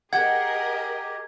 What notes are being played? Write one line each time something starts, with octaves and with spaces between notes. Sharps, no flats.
G4 G#4 A#4 D#5 F#5 G#6